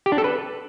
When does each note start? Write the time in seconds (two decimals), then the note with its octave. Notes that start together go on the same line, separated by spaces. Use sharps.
0.06 G4
0.12 D4
0.18 A4
0.24 B4